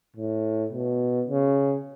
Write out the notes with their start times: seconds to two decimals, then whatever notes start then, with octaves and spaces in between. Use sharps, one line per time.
0.17 A2
0.72 B2
1.28 C#3